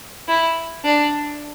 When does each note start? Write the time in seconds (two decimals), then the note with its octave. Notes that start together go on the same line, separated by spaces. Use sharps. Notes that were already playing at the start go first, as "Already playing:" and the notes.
0.28 E4
0.84 D4